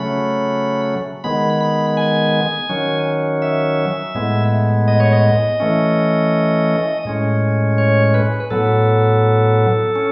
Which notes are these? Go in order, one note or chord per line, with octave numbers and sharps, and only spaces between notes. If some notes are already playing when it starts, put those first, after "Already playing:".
Already playing: C#3 F#3 A3 C#4 B5
D#3 G#3 B3 B5
B5
G#5
D#3 F#3 C#4
E5
A2 G#3 B3
D#5
C#5
D#5
E3 A3 C#4
A2 G#3 C#4
C#5
B4
A2 F#3 B3 A4
C#4